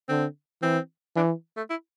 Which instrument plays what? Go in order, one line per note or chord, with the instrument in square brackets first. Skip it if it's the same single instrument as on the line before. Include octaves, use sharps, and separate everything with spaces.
[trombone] D3 [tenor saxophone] C4
[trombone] E3 [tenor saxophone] C4
[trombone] E3 [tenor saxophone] D4
[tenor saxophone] A3
E4